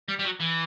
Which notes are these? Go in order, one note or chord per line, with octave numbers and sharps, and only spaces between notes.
G3
G3
F#3
E3